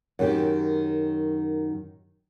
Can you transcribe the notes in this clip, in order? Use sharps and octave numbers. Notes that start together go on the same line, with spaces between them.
F#2 D#3 G4